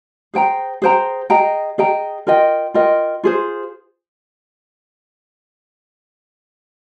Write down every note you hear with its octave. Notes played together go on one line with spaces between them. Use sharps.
G#4 C5 G5 A#5
G#4 C5 G5 A#5
G#4 D#5 G5 A#5
G#4 D#5 G5 A#5
F4 A#4 D#5 G5
F4 A#4 D#5 G5
F4 G#4 C5